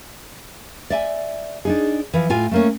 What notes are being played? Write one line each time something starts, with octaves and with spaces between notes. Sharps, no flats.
D5 E5 G#5
D4 D#4 G#4
E3 F3
A2 F4 G#5
A3 A#3 C#4